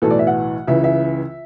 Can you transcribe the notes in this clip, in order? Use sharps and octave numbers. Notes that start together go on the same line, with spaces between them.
B1 A2 E3 A4
D5
E5
F#5
C#2 C#3 E3 E5
E5